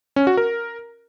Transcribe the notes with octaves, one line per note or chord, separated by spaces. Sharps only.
C#4
F#4
A#4